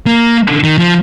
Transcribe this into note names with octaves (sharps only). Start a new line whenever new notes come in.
A#3
D#3
F3